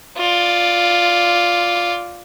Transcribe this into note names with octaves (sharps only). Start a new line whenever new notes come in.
F4 D5